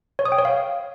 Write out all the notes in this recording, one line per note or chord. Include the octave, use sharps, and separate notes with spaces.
C#5
D#6
G5
C#5
F5